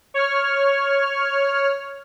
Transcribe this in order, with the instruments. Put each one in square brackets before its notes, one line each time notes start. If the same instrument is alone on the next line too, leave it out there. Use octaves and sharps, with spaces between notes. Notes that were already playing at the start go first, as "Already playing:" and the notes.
[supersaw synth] C#5 F6